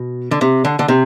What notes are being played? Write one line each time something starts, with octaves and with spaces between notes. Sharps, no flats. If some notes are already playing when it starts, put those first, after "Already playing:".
Already playing: B2
D3
C3
D3
D3
C3